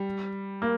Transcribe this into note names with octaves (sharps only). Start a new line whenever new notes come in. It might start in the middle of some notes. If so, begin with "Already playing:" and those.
Already playing: G3
A#3